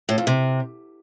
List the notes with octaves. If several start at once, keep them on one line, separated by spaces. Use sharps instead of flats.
A2
F2
C3